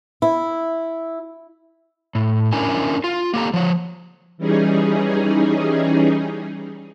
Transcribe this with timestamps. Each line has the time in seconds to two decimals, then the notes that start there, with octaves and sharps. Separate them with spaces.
0.22 E4
2.15 A2
2.53 C#4 D4 E4 A#4 G#5
3.04 F4
3.34 A#3 G4 A4 A#5
3.53 F3 C#5
4.38 E3 G3 C#4 D#4 G#4